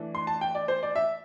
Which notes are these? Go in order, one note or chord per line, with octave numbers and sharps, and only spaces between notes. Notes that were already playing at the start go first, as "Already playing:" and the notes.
Already playing: E3 A3 D4
C6
A5
G5
D5
C5
D5
E5